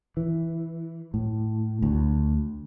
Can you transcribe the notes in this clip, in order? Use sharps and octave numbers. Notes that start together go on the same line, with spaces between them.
E3
A2
D2